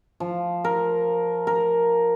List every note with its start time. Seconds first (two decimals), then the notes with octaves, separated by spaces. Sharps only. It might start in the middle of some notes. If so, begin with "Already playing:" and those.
0.20 F3
0.64 A#4
1.47 A#4